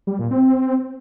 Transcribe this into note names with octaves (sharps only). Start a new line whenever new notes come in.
G3
A#2
C4